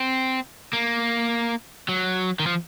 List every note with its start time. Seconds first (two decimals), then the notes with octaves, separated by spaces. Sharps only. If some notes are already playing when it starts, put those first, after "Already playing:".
Already playing: C4
0.73 A#3
1.89 F#3
2.39 D#3
2.46 F3